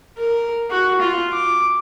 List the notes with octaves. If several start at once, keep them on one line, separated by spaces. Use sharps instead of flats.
A#4
F#4
F4
D6